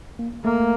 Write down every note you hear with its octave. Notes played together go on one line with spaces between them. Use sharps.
A#3
A3 A#3